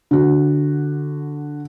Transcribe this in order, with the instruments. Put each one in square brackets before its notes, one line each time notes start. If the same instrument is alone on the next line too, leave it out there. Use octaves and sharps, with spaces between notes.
[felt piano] D3 F#4